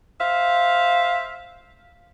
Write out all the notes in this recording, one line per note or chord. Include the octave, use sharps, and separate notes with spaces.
C5 E5 F5